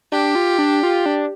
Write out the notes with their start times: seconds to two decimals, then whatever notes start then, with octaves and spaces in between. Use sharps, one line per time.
0.12 D4 G4
0.35 F4
0.58 D4
0.83 F4
1.06 D4